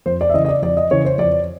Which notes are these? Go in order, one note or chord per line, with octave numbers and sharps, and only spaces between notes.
F2 C5
D5
E5
C#3 E3 D#5
D#5
D5
F2 D5
D#5
C#3 E3 C#5
C5
F2 D5